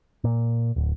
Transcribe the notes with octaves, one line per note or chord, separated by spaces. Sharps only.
A#2
D1